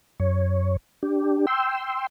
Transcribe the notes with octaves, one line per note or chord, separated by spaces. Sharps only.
F#2 C#5
D4 G4
G5 C6 E6